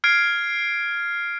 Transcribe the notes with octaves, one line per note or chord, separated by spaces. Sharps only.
F6 G#6 C7 D7